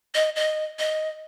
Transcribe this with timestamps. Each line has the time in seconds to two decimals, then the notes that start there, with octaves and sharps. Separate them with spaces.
0.15 D#5
0.36 D#5
0.79 D#5